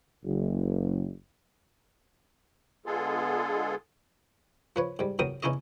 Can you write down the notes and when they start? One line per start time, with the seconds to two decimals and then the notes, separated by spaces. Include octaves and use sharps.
0.24 F#1
2.86 D3 G#3 B3 F4 G#4 A4
4.76 F3 B4 C#5
4.99 G#2 G3
5.19 E2 F#3 A#4 G5 D#6
5.43 E2 C#4 D#4 E4 C#5 D#5